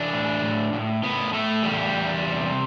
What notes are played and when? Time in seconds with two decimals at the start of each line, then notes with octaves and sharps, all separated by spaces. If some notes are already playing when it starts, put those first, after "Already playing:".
Already playing: E3 D4
0.13 A2
0.42 A2
0.73 A2
1.03 A2 B3
1.33 A2 A3
1.63 E2 G3
1.93 E2
2.24 C3